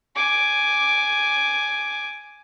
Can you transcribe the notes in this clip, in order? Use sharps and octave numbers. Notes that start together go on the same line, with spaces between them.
G#5 D6